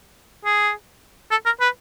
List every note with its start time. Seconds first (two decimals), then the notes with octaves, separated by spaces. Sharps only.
0.45 G#4
1.31 A4
1.45 A#4
1.60 B4